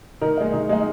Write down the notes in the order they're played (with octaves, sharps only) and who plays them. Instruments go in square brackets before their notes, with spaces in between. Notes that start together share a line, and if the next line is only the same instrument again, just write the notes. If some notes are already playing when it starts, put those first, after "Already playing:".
[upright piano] D#3 A#4
G#3 D#4
D#3
G#3 D#4